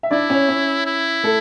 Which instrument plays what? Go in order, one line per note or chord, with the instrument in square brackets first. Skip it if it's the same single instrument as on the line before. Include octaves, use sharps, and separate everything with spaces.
[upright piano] E5
[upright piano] D4 D5 [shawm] E4
[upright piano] C#4 C#5
C#4 C#5
[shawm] E4
[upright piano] A3 A4